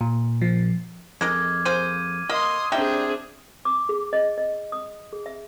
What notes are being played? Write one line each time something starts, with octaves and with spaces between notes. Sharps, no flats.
A#2
F3
F2 G#3 A#4 D#5 D6 F6 G#6
A#3 G#4 C5 D#7
A#3 D#5 C6 D#6
G3 C4 D4 D#4 G#4 E5 G5
D6
G#4
D#5
D#5
D#6
G#4
E5